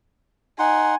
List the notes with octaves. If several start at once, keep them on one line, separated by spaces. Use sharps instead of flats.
D#4 F#5 G#5 C6